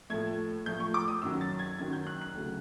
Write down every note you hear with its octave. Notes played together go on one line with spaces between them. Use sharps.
A2 F3 A3 G#6
A2 F3 A3 G6
C#6
D6
D#6
F#2 D#3 F#3 E6
A6
G#6
F#2 D#3 F#3 G#6
G6
F#6
F#6
D2 C#3 F#3